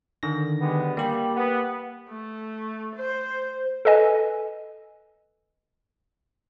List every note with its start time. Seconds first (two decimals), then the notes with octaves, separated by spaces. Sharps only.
0.23 D3 D#3 A#6
0.61 G3 G#3 B3
0.97 G3 A#3 G4
1.36 B3
2.09 A3
2.96 C5
3.85 A4 B4 D#5 G#5